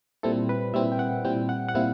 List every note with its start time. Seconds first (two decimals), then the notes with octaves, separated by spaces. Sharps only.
0.23 A#2 G3 C4 E4 A4
0.49 B4
0.74 A#2 G3 C4 E4 E5
0.92 G5
0.99 F#5
1.24 A#2 G3 C4 E4 G5
1.49 F#5
1.69 F#5
1.75 A#2 G3 C4 E4 F5